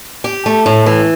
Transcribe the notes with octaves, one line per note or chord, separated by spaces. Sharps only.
G4
A3
A2
E3